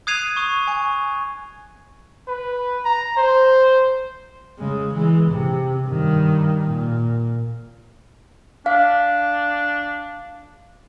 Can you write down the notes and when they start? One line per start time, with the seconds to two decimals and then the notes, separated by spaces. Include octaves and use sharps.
0.07 D#6 F#6 G#6 C7 D#7 F7
0.37 C#6 D#6
0.67 G#5 C#6
2.28 B4
2.85 A#5
3.17 C5
4.59 C#3 G#3
4.94 E3 G#3
5.31 C3
5.87 G2 D#3
6.68 A#2
8.66 D4 F5